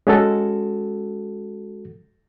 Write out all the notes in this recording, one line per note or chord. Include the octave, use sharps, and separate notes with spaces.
G#3 C#4 F#4 A4